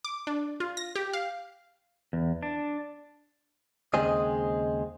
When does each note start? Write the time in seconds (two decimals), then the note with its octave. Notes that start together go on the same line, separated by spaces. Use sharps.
0.05 D6
0.27 D4
0.60 F4
0.77 A#6
0.96 G4
1.13 F5
2.13 E2
2.43 D4
3.94 D#2 C#3 G#3 C4 G#4 D#5